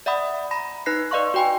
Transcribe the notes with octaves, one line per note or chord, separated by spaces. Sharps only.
D5 E5 F#5 B5 D#6
A#5 B5 A#6
D#4 B4 F#6 A#6 C7
B4 D5 D#5 F5 C6 C#6
F#4 B4 G5 G#5 C6